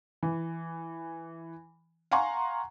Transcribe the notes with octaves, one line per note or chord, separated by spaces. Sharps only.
E3
F5 F#5 G#5 A#5 C6 C#6